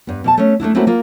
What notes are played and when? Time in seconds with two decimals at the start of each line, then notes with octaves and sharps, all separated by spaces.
0.07 G2 B3
0.24 B2 D5 A5
0.37 A3 C#4
0.60 A3 A#3 D4 E4
0.75 A3 A#3 C4 C#4 E4 F#4
0.87 A#3 F4